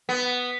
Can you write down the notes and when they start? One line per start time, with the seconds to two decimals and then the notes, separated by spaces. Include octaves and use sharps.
0.09 B3